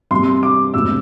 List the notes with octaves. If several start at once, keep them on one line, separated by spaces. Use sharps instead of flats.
C2 C3 G3 C6
D6
E1 D2 C3 E6